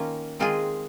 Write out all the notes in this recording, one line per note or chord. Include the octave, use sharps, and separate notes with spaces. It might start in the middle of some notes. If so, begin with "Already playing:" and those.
Already playing: D#3 A#3 C#4 F4
D#3 G#3 C4 F4 G#4